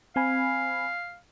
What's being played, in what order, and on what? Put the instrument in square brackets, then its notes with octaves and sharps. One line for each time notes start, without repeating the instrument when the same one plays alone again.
[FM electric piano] C4 G#5 B5 [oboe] F5